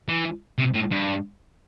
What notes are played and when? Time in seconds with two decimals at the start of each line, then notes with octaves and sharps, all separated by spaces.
0.08 E3
0.59 C3
0.75 A2
0.92 G2